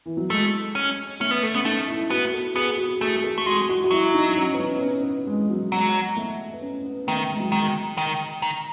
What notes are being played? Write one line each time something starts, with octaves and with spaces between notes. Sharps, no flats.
E3
F#3
G#3 A3
C#4
A3 C#4
B3
A3
B3 C#4
A3 D#4
E4
B3 F#4
A4
B3 G#4
F#4
A3 G#4
G#4
A4
A3
G#3 F#4
F#4
F#4
F#3 E4
D#4
D#4
C#4
B3
C#4
B3
C#4
B3
G#3
G#3
F#3
F#3 G#3
A3
B3
C#4
B3
D#3 A3
G#3
F#3
D#3 G#3
D#3
D#3